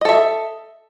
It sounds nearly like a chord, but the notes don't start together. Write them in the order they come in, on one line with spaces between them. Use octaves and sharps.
D#5 A4 E5